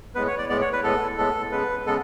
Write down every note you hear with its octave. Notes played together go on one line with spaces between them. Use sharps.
A2 G#3 B3 B4
C#5
D5
A2 G#3 B3 D5
C#5
B4
A2 G#3 B3 A4
A2 G#3 B3 A4
C#3 G#3 B3 B4
C#3 G#3 B3 A4